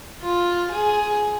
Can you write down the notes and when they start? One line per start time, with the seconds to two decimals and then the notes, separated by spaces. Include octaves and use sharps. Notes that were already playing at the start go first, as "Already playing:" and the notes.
0.21 F4
0.70 G#4